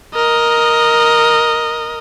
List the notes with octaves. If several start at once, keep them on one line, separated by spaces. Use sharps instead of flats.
A#4 D#5